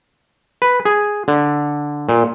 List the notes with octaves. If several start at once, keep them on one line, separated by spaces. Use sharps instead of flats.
B4
G#4
D3
A#2